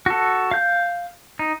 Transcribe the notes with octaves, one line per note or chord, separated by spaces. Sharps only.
F#4 A4
F5 G6
D#4